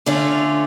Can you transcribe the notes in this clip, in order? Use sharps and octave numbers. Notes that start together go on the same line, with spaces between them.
D3 A3 C#4 F4